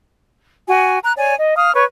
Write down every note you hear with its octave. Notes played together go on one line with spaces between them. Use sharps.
F#4 G#5
A#5 F#6
C#5 D5 G#5
D#5
F5 D#6 F6
B4 C#5 C#6